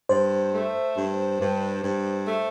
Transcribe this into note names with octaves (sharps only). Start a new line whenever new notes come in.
G2 C5
A3
G2
G2
G2
A3